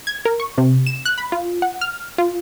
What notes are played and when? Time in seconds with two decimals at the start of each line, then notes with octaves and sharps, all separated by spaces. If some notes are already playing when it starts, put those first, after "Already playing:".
0.07 G#6
0.25 A#4
0.40 C#6
0.58 C3
0.87 E7
1.06 F#6
1.18 B5
1.32 F4
1.62 F#5
1.81 F6
2.18 F4